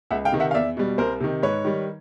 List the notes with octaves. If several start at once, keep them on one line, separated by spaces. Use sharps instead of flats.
C#2 E5 F#5
F5 G5
C3 D#3
E5 F#5
F5
E2 D5 E5
B2 G3
C2 A#4 C5
C3 D#3
G#2 B4 C#5
D#3 G3